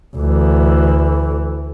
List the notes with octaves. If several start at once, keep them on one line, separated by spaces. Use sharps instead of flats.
D2 E3